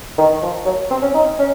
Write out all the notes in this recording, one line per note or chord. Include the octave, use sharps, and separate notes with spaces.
D#3
F3
F#3
C4
C#4
D#4
C#4